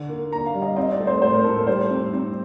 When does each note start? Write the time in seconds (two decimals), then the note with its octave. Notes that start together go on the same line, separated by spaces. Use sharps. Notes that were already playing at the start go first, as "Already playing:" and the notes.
Already playing: D3
0.09 A#3
0.32 A#3 A#5
0.46 F5
0.54 G3
0.62 D#5
0.76 C4 D#5
0.92 D5
1.00 A3
1.07 C5
1.22 A2 C5
1.34 A#4
1.44 A2 A4
1.56 A#4
1.67 G3 C5
1.91 C4
2.13 C4